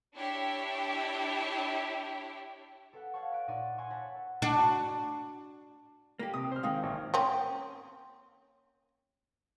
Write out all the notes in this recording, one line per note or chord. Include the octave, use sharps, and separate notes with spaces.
D4 E4 G4 C#5 E5 G5
A4 B4 F#5
C#5 F5 F#5 A5 C#6
B5 F#6 D7
A#2 D#4 D5 C#6 D#7
F#5 G#5 A#5 C6 C#6 E6
C#5 A5 B5 F#6 A#6 B6
D4 F#4
A#3 G4
C3 D#6
C5 F6
G#2 D#3 A#3 F5 G5 D#6
A1
A#3 C4 C#4